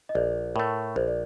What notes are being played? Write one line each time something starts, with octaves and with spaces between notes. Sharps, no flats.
D#5
A#1 D5
A2 A3 A#4
A#1 C5
D5